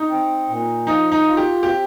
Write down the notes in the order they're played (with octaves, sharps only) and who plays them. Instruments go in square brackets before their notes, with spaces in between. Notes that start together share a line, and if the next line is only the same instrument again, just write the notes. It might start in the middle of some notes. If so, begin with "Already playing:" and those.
Already playing: [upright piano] D#4
[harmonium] C4
A#2
[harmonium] F3 [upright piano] D#4
[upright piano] D#4
[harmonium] F4
[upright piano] G4
[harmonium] C4 [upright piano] G4